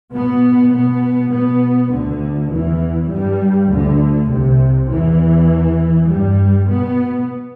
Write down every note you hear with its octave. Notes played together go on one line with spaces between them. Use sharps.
B2 B3
B2 B3
B2 B3
D2 D3
E2 E3
G2 G3
D2 D3
C2 C3
E2 E3
G2 G3
B2 B3